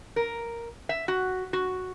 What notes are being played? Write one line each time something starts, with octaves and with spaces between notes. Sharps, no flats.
A#4
E5
F#4
F#4